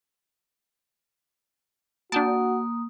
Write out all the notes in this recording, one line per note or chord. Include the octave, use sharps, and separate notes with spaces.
A#3 D4 F#4 G5 A5 D#6